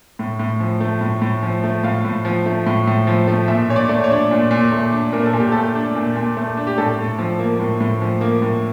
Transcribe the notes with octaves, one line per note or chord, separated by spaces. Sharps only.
A2
A2
F3
A3
A2
A2
F3
A3
A2 F5
A2
F3
A3
A2
A2
F3
A3
A#2 E5
A#2 C#5
D5
A3
C#5
D4
A#2
A#2
A3
D4
A#2 A#4
A4
A#2
G4
A3 A4
D4
A#2
A#2
A3
D4
G4
A2 A4
A2
F3
A#3
A2
A2
F3
A#3
A2